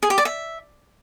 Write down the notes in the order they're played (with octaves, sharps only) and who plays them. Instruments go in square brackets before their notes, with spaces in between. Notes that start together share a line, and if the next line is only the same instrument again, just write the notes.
[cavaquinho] G#4
G4
D5
E5